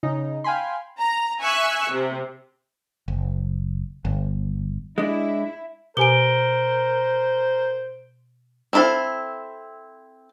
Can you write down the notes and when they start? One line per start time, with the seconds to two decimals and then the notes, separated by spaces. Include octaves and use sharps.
0.03 C#3 D#4
0.44 F5 G5 G#5 B5 C6
0.99 A#5
1.41 E5 G#5 C#6 E6 F#6
1.91 C3
3.08 F#1
4.05 G1
4.98 G#3 D4 E4
5.97 B2 G4 A#4 C5 G#5 D7 G7
8.73 C4 C#4 E4 A4 F5